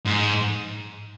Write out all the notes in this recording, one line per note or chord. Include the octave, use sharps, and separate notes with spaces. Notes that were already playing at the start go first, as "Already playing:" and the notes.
G#2